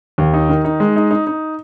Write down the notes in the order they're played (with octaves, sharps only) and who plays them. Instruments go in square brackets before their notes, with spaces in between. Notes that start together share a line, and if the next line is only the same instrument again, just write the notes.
[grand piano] D#2
D#4
D#3
D#4
G#3
D#4
D#4
D#4